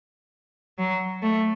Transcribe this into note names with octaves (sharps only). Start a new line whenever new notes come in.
F#3
A3